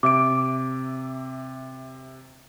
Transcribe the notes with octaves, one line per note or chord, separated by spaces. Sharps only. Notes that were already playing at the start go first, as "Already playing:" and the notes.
C3 E5 D6 D7